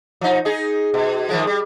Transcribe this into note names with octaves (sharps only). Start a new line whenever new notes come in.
F3 D#4
D#4 G#4
B2
D#3 F3 G#3
G3